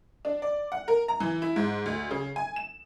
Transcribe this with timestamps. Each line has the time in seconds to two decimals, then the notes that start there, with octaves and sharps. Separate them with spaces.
0.25 D4
0.42 D5
0.72 F#5
0.88 A#4
1.08 A#5
1.20 E3
1.42 E4
1.56 G#2
1.86 D2
2.11 C#3
2.36 G#5
2.56 E7